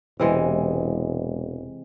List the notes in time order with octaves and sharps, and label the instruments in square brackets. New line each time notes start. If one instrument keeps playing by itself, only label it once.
[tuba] E1 [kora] C3 E3 G#3